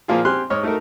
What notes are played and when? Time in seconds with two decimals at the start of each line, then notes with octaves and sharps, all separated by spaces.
0.08 A#2 F3 A#3 F4 G#4
0.25 C4 G4 G#5 C6 F6 F#6
0.50 G#2 C#5 D#5 F6
0.63 A3 D#4 F#4 A4 A#4